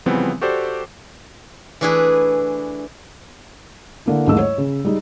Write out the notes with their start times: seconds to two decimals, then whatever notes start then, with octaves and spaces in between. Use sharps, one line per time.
0.06 C#3 E3 F3 G3 B3 C4
0.41 F#4 G4 A4 C5 D5
1.81 E3 A3 D4 E4 G#4 B4
4.06 D3 A#3 E4
4.26 D#1 A1 G#2 A3 A#3 E6
4.39 C#5
4.58 C#3
4.85 G3 G#3 D#4